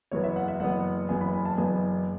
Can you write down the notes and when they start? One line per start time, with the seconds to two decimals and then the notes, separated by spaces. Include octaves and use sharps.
0.11 F#1 F#2 E3 B3 C#5
0.24 E5
0.36 F#5
0.48 E5
0.60 F#1 F#2 E3 B3 F#5
1.09 F#1 F#2 E3 B3 G#5
1.21 B5
1.33 G#5
1.45 A5
1.57 F#1 F#2 E3 B3 G#5